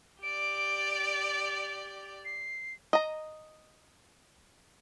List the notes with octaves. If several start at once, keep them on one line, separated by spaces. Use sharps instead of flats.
G4 D5 D7
C7
D#5 A#5